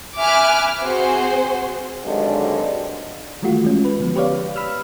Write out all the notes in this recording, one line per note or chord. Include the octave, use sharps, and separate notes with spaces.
E5 G#5 B5 D6 F6 F#6
C4 F#4 G#4 C5
G#1 G2 D3 F#3 G#3
D#3 E3 G3 A3 F4 F#4
G#3 C#4
B4
D3 F3 B3
G4 B4 C#5 D5 F5
B5 E6 F6